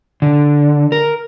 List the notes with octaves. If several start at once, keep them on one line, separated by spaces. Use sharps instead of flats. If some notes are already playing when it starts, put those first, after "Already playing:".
D3
A#4